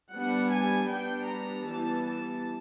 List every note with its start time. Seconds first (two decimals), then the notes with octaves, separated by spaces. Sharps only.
0.13 G3 B3 D4 F#5
0.51 G#5
0.90 G3 B3 D4 G5
1.28 A#5
1.67 E3 G3 B3 A5
2.06 A5